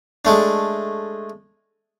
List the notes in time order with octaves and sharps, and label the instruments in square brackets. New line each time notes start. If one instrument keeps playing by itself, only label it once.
[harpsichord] G#3 A3 D4